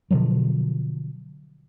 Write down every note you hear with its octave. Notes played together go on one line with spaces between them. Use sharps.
B2 D3 F3 F#3